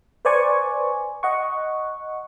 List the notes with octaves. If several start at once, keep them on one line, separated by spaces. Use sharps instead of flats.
B4 C5 D5 G#5 C#6
D#5 F#5 C#6